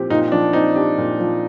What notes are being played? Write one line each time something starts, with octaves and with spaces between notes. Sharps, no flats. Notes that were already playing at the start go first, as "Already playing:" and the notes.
Already playing: A#2 F3 C4 G4
A#2 D#4
F3 D4
C4 D#4
D4 G4
A#2
F3